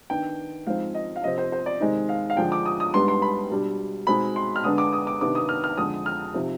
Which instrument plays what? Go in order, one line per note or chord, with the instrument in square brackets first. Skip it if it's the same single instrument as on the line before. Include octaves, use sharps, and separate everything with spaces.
[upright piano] D#3 B3 D4 G5
G#2 F3 G#3 C4 D#4 F5
D#5
F5
C3 F3 C4 D#5
C5
C5
D5
C3 D#3 G#3 C4 D#4 D#5
F5
F5
D3 F3 G#3 D4 G5
D6
D#6
D#6
G#2 G3 B3 D4 C6
C6
B5
B2 G3 D4
B2 G#3 C4 D#4 B5
C6
F6
D3 G#3 B3 D4 D#6
D6
D#6
D6
C3 D#3 B3 D4 D6
D#6
F6
F6
F2 D3 G#3 D#6
F6
C3 F3 C4 D#4